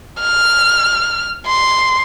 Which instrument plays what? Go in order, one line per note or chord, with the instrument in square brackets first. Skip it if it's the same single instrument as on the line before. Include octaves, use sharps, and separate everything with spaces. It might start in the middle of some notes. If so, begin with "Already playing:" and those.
[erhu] F6
C6